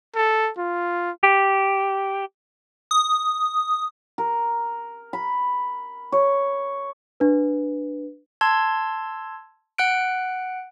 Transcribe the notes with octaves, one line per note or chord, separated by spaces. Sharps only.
A4
F4
G4
D#6
A#4
B5
C#5
D4 B4
A5 C6 E6 G#6
F#5 F#6 D7